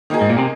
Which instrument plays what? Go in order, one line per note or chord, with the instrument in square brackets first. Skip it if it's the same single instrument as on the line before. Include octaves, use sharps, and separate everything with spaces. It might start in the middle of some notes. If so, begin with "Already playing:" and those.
[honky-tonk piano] D#3 A#3 D#4 G#4
[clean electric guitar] G#2
A#2
C3